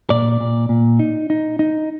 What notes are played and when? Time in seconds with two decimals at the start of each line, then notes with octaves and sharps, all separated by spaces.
0.10 A#2 D5
0.40 A#2
0.69 A#2
0.99 D#4
1.30 D#4
1.59 D#4